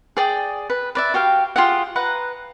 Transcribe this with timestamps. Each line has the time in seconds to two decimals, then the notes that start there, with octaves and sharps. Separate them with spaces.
0.17 G#4 D5 G5
0.70 B4
0.95 B4 D5 E5
1.14 F#4 G4 F5 G5
1.56 F4 G4 G#4 F#5
1.96 B4 F#5 A#5